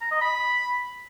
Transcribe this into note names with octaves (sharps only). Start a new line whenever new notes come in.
A#5
D#5
B5